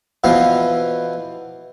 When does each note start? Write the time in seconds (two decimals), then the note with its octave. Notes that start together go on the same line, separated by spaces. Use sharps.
0.24 B2 E3 F3 B3 F5